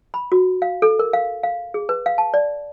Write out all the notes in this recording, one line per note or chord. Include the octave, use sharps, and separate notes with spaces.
B5
F#4
F5
A4
A#4
F5
F5
G#4
B4
F5
A5
D5